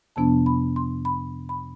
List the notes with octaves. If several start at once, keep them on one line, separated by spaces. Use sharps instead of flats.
F2 C3 F3 B3 D4 A5
B5
C6
B5
B5